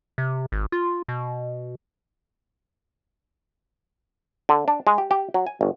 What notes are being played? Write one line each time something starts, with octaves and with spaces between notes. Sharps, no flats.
C3
G#1
F4
B2
D3
D4
G#3
G4
G4
F#3
G#5
G1